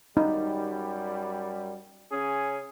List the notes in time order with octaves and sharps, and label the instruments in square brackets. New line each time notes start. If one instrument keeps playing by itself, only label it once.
[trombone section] F#2 G3 [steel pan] D#4
[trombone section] C#3 C#4 G#4